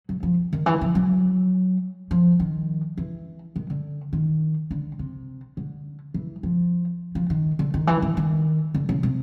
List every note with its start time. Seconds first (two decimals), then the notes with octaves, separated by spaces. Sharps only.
0.09 F#3
0.23 F3
0.53 D#3
0.66 E3
0.81 F3
0.95 F#3
2.11 F3
2.40 D#3
2.98 E3
3.56 D#3
3.70 D3
4.13 D#3
4.71 D3
4.99 C3
5.57 D3
6.14 E3
6.43 F3
7.15 F3
7.30 D#3
7.59 D3
7.74 D#3
7.87 E3
8.02 D#3
8.17 D#3
8.74 D3
8.89 C#3
9.03 C3